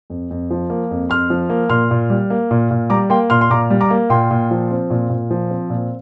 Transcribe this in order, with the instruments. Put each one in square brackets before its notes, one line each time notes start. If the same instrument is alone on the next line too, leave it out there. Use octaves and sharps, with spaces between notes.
[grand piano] F2
F2
F3
A#3
F2
F2 C6 F6
F3
A#3
A#2 C6 F6
A#2
G3
A#3
A#2
A#2
G3 A#5 D6
A#3 G5 C6
A#2 C6 F6
C6
A#2 A#5 D6
G3
A#5 D6
A#3
A#2 G5 C6
A#2
F3
C4
A#2
A#2
F3
C4
A#2